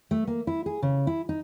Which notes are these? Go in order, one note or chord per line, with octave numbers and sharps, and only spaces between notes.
A3
A#3
E4
G#4
C#3
E4
D#4